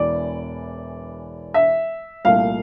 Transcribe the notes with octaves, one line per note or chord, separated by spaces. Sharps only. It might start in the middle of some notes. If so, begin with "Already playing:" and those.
Already playing: E1 E2 E3 D5
E5
C2 A#2 A3 F5